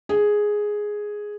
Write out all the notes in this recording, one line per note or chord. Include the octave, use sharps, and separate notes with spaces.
G#4